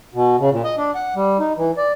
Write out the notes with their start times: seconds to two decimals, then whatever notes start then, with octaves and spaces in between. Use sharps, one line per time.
0.14 B2
0.40 C#3
0.51 A#2
0.64 D#5
0.78 D4
0.95 F#5
1.15 G3
1.40 D#4
1.57 E3
1.77 D5